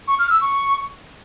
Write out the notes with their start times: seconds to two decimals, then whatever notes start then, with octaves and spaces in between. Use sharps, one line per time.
0.08 C#6
0.19 F6
0.30 E6
0.41 C#6